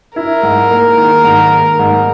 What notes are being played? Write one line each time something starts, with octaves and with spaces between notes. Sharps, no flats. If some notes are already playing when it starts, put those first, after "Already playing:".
E4 A#4
G#2
A#3
D#3
G#2
A#3
G#2